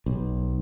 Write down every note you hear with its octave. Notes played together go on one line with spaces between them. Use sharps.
B1